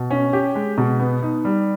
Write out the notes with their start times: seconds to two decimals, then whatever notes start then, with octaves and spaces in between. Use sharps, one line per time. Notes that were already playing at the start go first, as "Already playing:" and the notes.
Already playing: B2
0.10 C#4
0.33 G4
0.55 G#3
0.77 B2
1.00 B3
1.23 D#4
1.45 G3